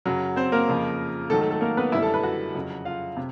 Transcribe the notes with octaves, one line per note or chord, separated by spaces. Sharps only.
F#2 C#3 F#3 F#4
C4 C5
A#3 A#4
F2 C#3 F3
G#2 D#3 F#3 A3 A4
A3 A4
A3 A4
A#3 A#4
B3 B4
F#2 D3 G3 E4 E5
A4 A5
B4 B5
F#4 F#5
F2 C#3 F#3
F4 F5
C3